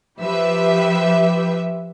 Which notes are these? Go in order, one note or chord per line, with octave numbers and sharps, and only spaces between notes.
F3 G4 B4 E5